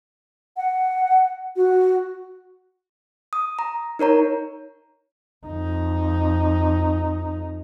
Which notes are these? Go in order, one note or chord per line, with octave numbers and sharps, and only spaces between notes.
F#5
F#4
D#6
A#5
D#4 A#4 C#5 A#5
F2 D#4